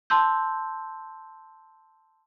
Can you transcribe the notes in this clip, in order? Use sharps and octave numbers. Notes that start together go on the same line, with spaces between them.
A5 C6 E6 G6